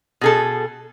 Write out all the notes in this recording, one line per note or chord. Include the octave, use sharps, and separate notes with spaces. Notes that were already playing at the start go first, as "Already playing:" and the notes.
B2 G#4 A4